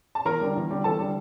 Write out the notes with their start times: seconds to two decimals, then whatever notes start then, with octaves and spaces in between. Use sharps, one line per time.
0.15 A5
0.25 E2 A#4 A#5
0.41 D3 G3
0.56 E2
0.71 D3 G3
0.84 E2 A4 A5
1.00 D3 G3